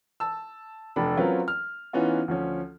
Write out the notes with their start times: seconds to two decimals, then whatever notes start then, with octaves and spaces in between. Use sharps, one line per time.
0.20 A5 E6
0.96 F1 D4 B5
1.17 F#3 C4 C#4 F4 A#4 B4
1.48 F6
1.93 E3 B3 C#4 D#4 F4
2.28 D2 F3 C#4